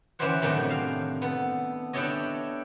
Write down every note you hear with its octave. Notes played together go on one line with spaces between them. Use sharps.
E3 C#4 E4 G4 C5 F#5
A2 C3 D#3 F#3 A3 D4
F5
B3 A4
D4 E4 G4 A4 C#5 D#5